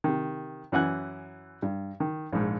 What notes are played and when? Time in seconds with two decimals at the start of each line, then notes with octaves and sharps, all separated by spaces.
0.04 C3 D#3
0.72 F#2 E3 F#5 G#5 F#6
1.62 G2
2.00 D#3
2.33 A#1 G#2